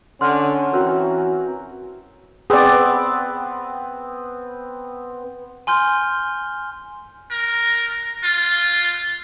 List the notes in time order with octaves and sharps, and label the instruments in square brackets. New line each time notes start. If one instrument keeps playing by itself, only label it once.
[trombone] D3 [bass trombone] C#4 [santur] F#5 [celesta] C6 F6
[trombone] E3 [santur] C4 F#4 A#4
[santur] B3 C4 [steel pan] G#4 D5
[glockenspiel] G#5 C6 F6 G6 G7
[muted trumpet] A#4
F4